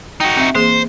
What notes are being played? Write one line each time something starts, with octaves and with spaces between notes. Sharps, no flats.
D#4 F#4 G5
C4 E5
E3 A#3 G#4 C5